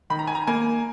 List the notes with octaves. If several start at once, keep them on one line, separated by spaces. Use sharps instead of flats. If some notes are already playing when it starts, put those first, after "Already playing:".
D#3 B5
A#5
G#5
A#5
A#3 G#5